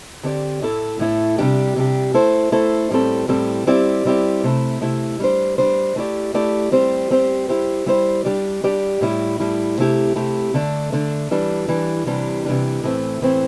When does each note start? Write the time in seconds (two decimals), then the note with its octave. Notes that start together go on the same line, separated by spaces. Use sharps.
0.23 D3 C4 G4 D5
0.61 A2 A3 E4 A4
0.99 A2 A3 E4 A4
1.38 C3 G3 D4 G4
1.76 C3 G3 D4 G4
2.14 A3 E4 A4 C5
2.52 A3 E4 A4 C5
2.90 A2 G3 C4 A4
3.28 A2 G3 C4 A4
3.67 G3 C4 E4 G4 D5
4.05 G3 C4 E4 G4 D5
4.44 C3 A3 E4
4.81 C3 A3 E4
5.20 G3 D4 C5
5.58 G3 D4 C5
5.96 A3 E4 G4 D5
6.34 A3 E4 G4 D5
6.72 G3 C4 G4 C5
7.10 G3 C4 G4 C5
7.48 G3 E4 G4 C5
7.86 G3 E4 G4 C5
8.25 G3 D4 G4 D5
8.64 G3 D4 G4 D5
9.01 A2 G3 E4
9.40 A2 G3 E4
9.78 C3 A3 E4 G4
10.16 C3 A3 E4 G4
10.54 D3 A3 D4
10.92 D3 A3 D4
11.31 E3 G3 D4
11.68 E3 G3 D4
12.06 C3 E3 G3 D4
12.45 C3 E3 G3 D4
12.83 A2 E3 A3 C4
13.21 A2 E3 A3 C4